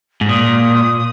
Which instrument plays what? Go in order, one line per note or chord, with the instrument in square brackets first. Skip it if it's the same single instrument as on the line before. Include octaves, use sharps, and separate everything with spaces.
[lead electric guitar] G#2
[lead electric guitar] A#2 [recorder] D#6